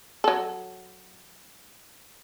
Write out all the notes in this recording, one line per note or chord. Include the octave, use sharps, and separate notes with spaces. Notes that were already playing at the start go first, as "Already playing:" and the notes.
F#3 A4